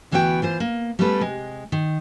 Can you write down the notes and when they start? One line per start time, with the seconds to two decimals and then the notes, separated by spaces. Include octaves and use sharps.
0.11 D2 E3 B3 F#4 D#5 G5
0.42 E3 F4 C5
0.60 A#3
0.99 G3 A3 B3 C#4 A4 B4
1.21 C3 G#3
1.72 D#3